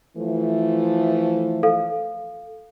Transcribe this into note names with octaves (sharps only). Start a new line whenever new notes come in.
E3 F3 A3
A4 F5